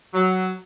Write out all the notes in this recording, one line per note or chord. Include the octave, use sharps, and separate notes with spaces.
F#3